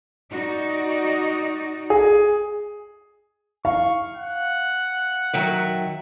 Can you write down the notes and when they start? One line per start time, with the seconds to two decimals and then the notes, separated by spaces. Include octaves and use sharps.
0.30 D#4 F#4 D5
1.90 G#4
3.65 F5 C#6
4.16 F#5
5.33 D#3 F#3 E5